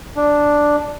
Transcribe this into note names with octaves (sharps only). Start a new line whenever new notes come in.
D4